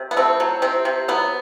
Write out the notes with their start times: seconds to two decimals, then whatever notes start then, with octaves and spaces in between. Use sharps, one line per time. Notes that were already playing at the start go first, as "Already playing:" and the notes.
Already playing: C3
0.11 B3
0.16 A3 C4
0.40 F#3
0.62 C3 C4
0.85 C3
1.08 F#3 B3